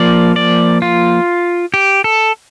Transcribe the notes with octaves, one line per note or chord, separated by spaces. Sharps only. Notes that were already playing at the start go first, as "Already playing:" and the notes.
Already playing: F3 A#3 D5
D5
F4
G4
A4